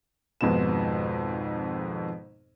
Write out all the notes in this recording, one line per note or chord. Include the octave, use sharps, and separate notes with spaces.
G#1 F2 G#2 B2 B3 E7